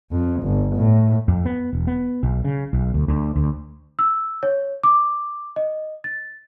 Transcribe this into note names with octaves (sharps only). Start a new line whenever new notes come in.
F2
G1
A2
F2
B3
E1
B3
B1
C#3
B1
D2
D2
D2
E6
C#5
D6
D#5
A6